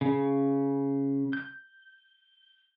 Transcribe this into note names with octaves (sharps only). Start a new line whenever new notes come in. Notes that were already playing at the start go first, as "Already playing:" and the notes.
C#3
G6